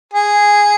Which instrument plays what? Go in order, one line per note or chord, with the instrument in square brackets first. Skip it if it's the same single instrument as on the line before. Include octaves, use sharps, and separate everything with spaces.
[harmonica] G#4